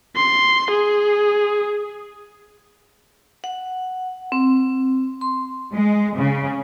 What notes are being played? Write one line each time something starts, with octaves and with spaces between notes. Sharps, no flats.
C6
G#4
F#5
C4
C6
G#3
C#3